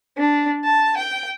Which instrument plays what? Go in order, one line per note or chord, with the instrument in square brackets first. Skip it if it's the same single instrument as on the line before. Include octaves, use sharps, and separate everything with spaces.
[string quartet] D4
A5
G5